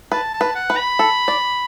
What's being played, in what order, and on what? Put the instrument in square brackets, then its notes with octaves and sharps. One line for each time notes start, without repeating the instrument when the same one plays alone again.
[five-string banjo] B4 [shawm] A5
[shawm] A5
[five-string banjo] B4
[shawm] F#5
[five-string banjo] B4
[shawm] B5
[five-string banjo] A4
D5